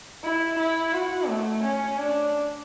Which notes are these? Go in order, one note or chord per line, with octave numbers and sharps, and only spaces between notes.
E4
E4
F#4
A3
C#4
D4